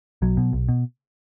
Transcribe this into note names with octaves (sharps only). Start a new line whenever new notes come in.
B1 F#3
B2
B1
B2